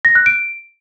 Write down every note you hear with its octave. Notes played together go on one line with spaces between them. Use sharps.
A#6
F#6
D7